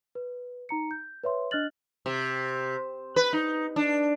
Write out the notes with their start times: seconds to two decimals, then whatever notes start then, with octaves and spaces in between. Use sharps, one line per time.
0.15 B4
0.69 D#4 A#5 C#7
0.91 G6
1.24 B4 C#5 E5 C6
1.51 D4 D#5 F6 F#6 A6 F#7
2.06 C3
3.16 B4
3.33 D#4
3.76 D4